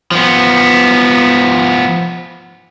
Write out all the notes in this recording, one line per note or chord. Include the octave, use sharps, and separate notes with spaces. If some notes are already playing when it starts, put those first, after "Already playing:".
F3 B3